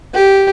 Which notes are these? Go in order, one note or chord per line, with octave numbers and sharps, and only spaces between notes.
G4